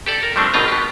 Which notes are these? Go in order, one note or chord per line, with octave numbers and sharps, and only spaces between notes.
G4 A4 D5
A#4
F3 G3 A3 C4 D4
G#1 B2 C4 F4 D#5 A#5
B3 G4